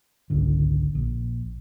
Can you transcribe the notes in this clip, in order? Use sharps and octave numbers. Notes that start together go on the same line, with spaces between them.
G#1 C#2 D3
A#1